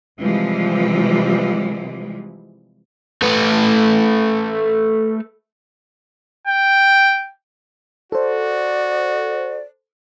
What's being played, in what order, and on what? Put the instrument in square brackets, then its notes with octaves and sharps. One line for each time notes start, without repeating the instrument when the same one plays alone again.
[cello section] C3 E3 F3 G3 G#3
[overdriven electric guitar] A3 B4
[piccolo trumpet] G5
[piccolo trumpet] F#4 [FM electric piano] A4 C5 [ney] D5